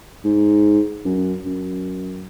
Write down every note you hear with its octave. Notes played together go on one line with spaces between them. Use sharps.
G#2
F#2
F#2